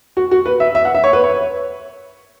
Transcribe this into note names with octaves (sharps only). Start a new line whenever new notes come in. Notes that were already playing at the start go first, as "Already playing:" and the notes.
F#4
F#4
B4
E5
E5
F#5
E5
C#5
B4
C#5